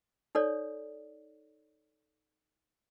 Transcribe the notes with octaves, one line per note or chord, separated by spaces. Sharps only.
D#4 A4 C#5 D5